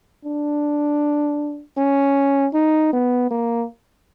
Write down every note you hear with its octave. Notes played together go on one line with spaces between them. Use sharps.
D4
C#4
D#4
B3
A#3